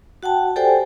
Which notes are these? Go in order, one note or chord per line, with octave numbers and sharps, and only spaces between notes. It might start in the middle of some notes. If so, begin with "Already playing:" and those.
F#4 F#5 G5 A5
G4 A4 C5 D5 G5 G#5